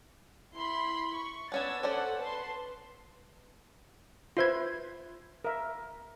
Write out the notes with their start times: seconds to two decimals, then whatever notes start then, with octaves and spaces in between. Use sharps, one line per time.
0.57 E4 B5 C6
1.18 C#6
1.52 B3 C#4 D4 E6 G#6 A6
1.83 C#4 A4 C5 D5 F#5
2.20 B4 A5 C6
4.37 F4 B4 C5 E5 C6 G#6
5.45 A#4 E5